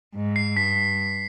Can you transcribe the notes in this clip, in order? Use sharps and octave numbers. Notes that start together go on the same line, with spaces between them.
G#2
C7
G2 B6